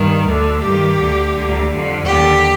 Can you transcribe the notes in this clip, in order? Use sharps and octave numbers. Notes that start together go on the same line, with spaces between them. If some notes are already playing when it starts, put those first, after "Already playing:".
Already playing: G2 D#3
D2 D3
G2 D#3 G4
D2 D3
D2 D3
F2 D3
D#2 D3 G4